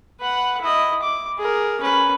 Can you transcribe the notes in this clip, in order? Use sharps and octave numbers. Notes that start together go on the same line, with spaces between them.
B4 F#5
E4 D#5
D6
G#4 A#4
C#4 B4